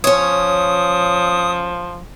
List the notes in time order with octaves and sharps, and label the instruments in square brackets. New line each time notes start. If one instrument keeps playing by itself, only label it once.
[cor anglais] F3 [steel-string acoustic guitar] C#4 C#5 [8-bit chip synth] D#6